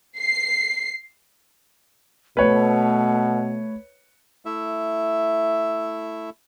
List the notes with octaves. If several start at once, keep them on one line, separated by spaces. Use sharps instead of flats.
C7
B2 A3 B4 C#5
A3 E4 E5